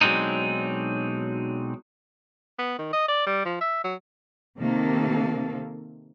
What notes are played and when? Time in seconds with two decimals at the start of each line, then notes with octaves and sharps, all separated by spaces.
0.01 B1 F#3 G#3 C4 D4 D#4
2.59 B3
2.79 D#3
2.93 D#5
3.08 D5
3.27 G3
3.46 F3
3.61 E5
3.84 F#3
4.58 C3 D#3 A#3 C4 A4